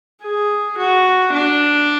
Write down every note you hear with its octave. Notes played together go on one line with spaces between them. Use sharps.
G#4
F#4
D4